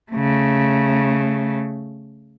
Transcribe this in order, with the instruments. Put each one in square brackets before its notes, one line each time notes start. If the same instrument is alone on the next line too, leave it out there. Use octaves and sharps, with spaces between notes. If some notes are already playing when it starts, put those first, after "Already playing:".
[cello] C#3 A3